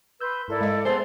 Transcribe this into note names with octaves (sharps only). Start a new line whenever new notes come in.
B4 C6 E6 G6
G#2 E4 A4 A#4 D5 B5
G#3 D#5
B3 G#4 C5 E5 A5